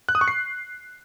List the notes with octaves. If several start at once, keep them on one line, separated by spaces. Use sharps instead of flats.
F#6
D#6
C#6
C7